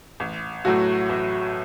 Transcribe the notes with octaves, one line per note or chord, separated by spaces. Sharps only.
A1
A2 F#3 A3 F#4
A1